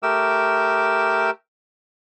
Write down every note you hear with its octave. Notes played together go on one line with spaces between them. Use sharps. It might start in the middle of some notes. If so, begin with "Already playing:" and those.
A3 G4 A#4 D6 E6